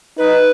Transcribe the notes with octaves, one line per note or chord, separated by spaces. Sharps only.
D#4 B4